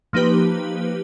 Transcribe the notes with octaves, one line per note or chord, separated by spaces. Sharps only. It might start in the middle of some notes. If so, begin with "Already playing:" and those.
F3 A#3 D#4 G4 B4